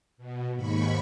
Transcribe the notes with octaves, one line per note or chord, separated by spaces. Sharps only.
B2
D#2 G#2 B5 C#6